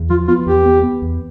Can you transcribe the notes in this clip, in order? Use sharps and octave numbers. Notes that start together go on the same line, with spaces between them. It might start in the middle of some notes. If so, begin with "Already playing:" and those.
Already playing: E2
F3 F4
B3 F4
E2 G4
B3
B3
E2